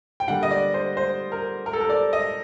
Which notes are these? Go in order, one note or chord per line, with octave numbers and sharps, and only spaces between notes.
G5
D3 G3 A#3 F#5
D#5
D5
C5
C5
A#4
A#4
A4
A#4
D5
D#5